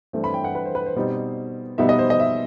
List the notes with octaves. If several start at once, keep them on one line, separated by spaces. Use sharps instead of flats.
G2 E3 A3 C4
B5
G5
F#5
B4
C5
B4
C5
B2 G3 C4 D#4
B2 G3 B3 D#4 E5
D#5
C5
D#5
E5